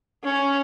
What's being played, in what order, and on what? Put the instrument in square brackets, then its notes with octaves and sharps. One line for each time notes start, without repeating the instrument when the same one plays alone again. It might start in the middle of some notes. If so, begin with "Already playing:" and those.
[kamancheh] C#4